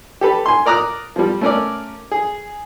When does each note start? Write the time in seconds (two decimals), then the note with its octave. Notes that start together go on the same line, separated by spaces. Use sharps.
0.21 G4 A4 B4
0.46 G#5 C6
0.66 A#4 D5 A#5 D#6 F#6
1.16 F3 G3
1.41 A3 C#4 A#4 D5
2.11 G#4